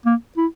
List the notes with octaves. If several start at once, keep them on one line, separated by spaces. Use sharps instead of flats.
A#3
E4